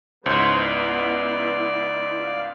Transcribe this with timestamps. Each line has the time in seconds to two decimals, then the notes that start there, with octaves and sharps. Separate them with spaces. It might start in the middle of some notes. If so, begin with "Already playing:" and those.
0.26 C#2 G#2 B3 E4 C5 C#5
0.62 D5
2.22 F5